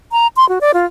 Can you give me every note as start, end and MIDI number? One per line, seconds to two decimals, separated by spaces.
0.12 0.27 82
0.36 0.48 84
0.49 0.59 66
0.61 0.72 74
0.74 0.86 65